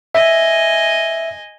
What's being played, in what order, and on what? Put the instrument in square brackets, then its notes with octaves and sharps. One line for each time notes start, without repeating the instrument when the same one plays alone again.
[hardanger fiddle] D#5 G#5 [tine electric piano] E5